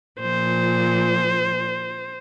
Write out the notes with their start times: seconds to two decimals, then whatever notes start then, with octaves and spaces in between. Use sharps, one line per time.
0.20 A#2 F3 C5